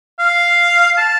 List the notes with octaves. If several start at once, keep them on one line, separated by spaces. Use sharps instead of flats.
F5
A5